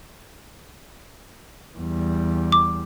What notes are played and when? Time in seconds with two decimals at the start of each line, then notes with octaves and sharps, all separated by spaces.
1.78 E2 G3
2.52 D6